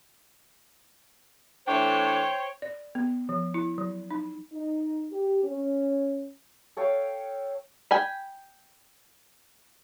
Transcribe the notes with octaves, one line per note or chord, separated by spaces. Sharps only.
E3 A3 D4 C5 C#5 G5
D5
B3
F3
E4
F#3
D#4
D#4
G4
C#4
A4 C#5 F5 G5
G5 G#5 B5